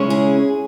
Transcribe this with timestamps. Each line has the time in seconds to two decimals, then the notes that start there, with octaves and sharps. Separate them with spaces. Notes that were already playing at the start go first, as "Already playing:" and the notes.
Already playing: C#3 G#3 C#4 E4
0.10 G#4